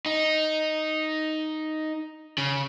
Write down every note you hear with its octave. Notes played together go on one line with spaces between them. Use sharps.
D#4
C#3